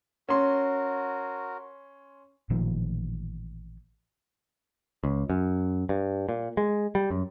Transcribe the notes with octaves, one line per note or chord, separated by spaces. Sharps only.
C#4 F#4 A#4 C6
A1 A#2 D#3 F3
C#2
F#2
G2
A#2
G#3
G3
F#2